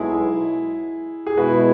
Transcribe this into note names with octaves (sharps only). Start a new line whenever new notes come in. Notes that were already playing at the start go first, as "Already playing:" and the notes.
Already playing: B1 B2 G#3 E4 G#4
G#4
B2 G#3 E4 F#4 B4